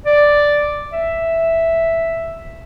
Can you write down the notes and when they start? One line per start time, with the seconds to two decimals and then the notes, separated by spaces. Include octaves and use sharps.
0.06 D5
0.93 E5